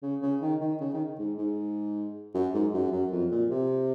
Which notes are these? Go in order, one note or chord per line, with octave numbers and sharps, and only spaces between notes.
C#3
C#3
D#3
D#3
C#3
D#3
G#2
G#2
F#2
G#2
F#2
F#2
F2
A#2
C3